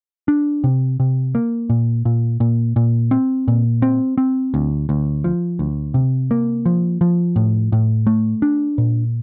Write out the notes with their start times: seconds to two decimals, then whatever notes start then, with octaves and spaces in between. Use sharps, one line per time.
0.28 D4
0.64 C3
1.00 C3
1.35 A#3
1.70 A#2
2.05 A#2
2.40 A#2
2.76 A#2
3.11 C4
3.48 A#2
3.82 C4
4.18 C4
4.54 D2
4.89 D2
5.24 F3
5.59 D2
5.94 C3
6.31 A#3
6.66 F3
7.01 F3
7.36 A2
7.72 A2
8.07 A3
8.42 D4
8.78 A#2